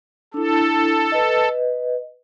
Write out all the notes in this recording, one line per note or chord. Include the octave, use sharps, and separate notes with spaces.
D4 E4 A4
B4 D#5